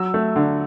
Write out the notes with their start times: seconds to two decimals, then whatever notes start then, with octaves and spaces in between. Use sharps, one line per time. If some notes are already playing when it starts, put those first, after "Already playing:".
Already playing: F#3 E6
0.14 A3
0.36 D3